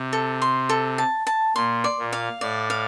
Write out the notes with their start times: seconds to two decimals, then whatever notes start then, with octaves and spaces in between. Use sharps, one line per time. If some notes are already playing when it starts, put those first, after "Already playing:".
Already playing: C3
0.13 A4
0.42 C6
0.69 A4
0.98 A5
1.27 A5
1.56 A#2 C6
1.84 D5
1.99 A#2
2.13 F5
2.41 A2 D5
2.70 F5